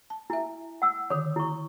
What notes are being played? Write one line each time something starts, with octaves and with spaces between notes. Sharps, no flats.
A5
E4 E5 G#5
F#5 E6
D3 D#3 C#5
E4 C#6